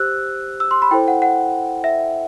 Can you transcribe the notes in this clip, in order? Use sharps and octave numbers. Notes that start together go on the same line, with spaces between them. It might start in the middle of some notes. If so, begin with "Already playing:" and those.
Already playing: G4 C5 E6 F#6
E6
C6
B5
E4 A4 C5 G5
F#5
F#5
E5